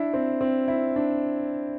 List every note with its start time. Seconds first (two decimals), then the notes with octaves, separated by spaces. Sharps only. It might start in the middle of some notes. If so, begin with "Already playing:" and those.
Already playing: D4 E4
0.14 C4
0.41 C4
0.68 E4
0.96 D4